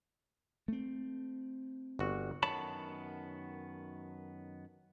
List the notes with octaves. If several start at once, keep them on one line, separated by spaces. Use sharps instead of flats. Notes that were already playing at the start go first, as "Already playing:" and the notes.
A3 C4
G1 F#4
F#2 D#3 B3 C#5 A5 B5